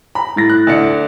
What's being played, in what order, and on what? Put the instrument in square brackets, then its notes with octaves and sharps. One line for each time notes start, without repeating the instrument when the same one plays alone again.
[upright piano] A#5 [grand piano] B5
[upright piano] A2 A6 A#6
[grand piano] F#6
D2 D4 C#7